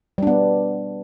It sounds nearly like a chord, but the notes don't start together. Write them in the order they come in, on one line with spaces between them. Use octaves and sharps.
G3 D4 B3